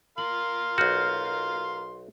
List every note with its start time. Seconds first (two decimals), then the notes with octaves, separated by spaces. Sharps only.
0.18 A#4 F5 C6 F#7
0.78 B1 F#4 F6 G6